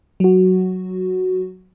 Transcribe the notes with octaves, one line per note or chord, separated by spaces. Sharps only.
F#3 F#4